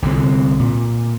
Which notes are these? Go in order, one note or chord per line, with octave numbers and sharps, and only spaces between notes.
C2 D3 D#3 C4
A#2